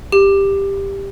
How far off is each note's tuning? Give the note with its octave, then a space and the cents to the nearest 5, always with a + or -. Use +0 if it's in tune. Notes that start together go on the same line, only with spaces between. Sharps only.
G4 +10